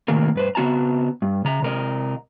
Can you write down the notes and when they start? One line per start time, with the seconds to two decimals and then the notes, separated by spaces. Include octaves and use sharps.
0.08 A2 C3 D#3 A#3 A#4
0.35 G2 B4 C5
0.55 C#3 B3 F#4 A5 A#5
1.22 G2
1.45 C#3 A#5
1.62 C3 A#4 D#5